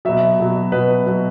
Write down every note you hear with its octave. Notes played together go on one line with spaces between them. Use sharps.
B2 F#3 E5
B2 F#3
B2 F#3 B4
B2 F#3